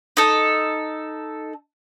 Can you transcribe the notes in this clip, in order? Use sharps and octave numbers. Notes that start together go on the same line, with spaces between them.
D#4 A4